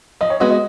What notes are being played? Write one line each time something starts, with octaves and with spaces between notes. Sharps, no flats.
F3 D#5
C#5
G#3 B3 F#4 D#5
D#5